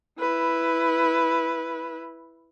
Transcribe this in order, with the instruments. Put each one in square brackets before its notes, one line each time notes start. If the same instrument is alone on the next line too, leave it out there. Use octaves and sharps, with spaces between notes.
[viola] E4 B4